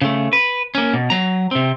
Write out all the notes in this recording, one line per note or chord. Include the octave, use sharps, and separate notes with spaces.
C#3 A3
B4
A#3 C#4
B2
F#3 A#5
C3 C4